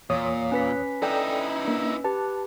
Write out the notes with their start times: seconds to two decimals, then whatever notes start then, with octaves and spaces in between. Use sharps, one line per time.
0.10 E2 A#2 C#5 D#6
0.52 C#4 B4 B6
1.02 D#4 E4 A4 D5 G5
1.65 A#3 D4
2.04 G4 B4 A5